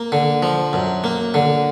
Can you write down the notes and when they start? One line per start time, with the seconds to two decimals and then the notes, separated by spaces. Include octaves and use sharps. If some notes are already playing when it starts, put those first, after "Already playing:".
Already playing: A#3
0.12 D3
0.43 F3
0.73 F#2
1.04 A#3
1.34 D3